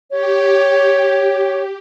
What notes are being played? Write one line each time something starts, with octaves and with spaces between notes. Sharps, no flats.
G4 C#5